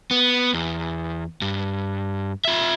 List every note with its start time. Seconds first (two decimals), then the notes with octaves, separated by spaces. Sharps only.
0.11 B3
0.54 E2
1.42 G2
2.45 F4 E5